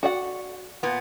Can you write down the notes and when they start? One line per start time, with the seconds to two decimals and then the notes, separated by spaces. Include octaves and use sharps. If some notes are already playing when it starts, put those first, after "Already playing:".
0.03 F#4 D5 F#5
0.83 A#2 B3